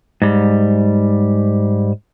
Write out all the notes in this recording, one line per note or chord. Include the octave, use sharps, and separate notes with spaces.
G#2 G3